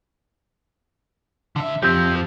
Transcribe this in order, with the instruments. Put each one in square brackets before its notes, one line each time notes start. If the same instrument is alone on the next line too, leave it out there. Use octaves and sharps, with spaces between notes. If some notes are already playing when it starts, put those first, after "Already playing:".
[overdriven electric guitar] D3 E5
[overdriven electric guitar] F2 F3 [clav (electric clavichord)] C4 G4